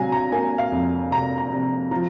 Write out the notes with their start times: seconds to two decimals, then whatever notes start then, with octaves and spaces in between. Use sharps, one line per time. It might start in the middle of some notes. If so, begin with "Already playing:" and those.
Already playing: C3 F#3 F5 G#5 A#5
0.12 A#5
0.32 A#3 G#5
0.58 F5
0.72 F2
1.11 C3 A#5
1.38 A#5
1.52 C3
1.91 F3 A#5